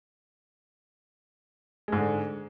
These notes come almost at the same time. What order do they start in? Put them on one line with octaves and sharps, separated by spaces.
G#3 G#2 D3